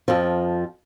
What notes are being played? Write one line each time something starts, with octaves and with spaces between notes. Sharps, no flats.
F2 F3